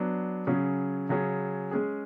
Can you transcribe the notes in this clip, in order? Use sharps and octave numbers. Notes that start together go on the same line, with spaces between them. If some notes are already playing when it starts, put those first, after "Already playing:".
Already playing: F#3 B3 D4
C#3 F#3 C#4 G#4
C#3 F#3 C#4 G#4
G#3 C#4 G#4